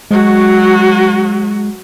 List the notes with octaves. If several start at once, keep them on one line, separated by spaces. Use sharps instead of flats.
F#3 G#3 F#4